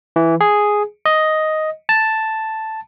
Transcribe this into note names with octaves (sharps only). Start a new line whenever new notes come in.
E3
G#4
D#5
A5